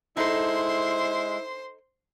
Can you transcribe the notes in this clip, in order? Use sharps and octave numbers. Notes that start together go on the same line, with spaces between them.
G#3 D#4 E4 A4 C5 C6